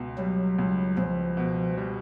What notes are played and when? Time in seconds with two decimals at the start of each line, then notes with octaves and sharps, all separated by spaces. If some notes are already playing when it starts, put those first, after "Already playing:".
Already playing: C#2 B2
0.18 F#3 G3
0.58 C#2
0.97 C#2 F3
1.37 B2
1.77 G3